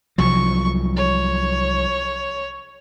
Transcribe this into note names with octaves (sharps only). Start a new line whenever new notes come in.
C2 F3 F#3 C#6
C#5